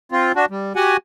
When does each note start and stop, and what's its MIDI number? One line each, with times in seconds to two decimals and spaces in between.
0.12 0.32 60
0.12 0.32 65
0.36 0.46 62
0.36 0.46 66
0.50 0.73 55
0.76 0.97 66
0.76 0.97 67
0.76 0.97 78
0.76 0.97 80